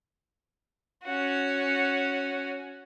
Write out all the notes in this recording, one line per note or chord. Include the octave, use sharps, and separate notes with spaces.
C#4 F#4